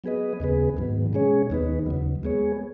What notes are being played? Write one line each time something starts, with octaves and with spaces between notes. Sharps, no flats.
F#3 B3 G#4 B4 D#5
D#2 C#3 B3 G#4 B4
G#2 D#3 F#3 B3
B2 G#3 C#4 G#4 C#5
D#2 D#3 B3 D#4 B4
D#2 C#3 F#3
G#3 B3 G#4 C#5